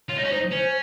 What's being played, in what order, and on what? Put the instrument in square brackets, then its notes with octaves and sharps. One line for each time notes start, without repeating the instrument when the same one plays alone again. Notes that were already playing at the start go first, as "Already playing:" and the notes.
[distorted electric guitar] F4 [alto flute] C#5
[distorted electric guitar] D#4
C#4
[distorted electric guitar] D#4 [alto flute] C5
[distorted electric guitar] C#4 [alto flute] C5